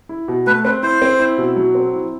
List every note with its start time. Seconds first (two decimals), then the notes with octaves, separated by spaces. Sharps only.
0.09 E4
0.28 B2
0.47 A3 B4
0.65 C4 B4
0.83 E4 C5
1.02 C4
1.19 E4
1.38 B2
1.56 F#3
1.75 C4
1.93 E4